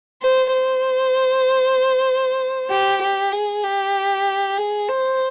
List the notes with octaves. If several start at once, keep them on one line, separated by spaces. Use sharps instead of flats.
C5
C5
G4
G4
G#4
G4
G#4
C5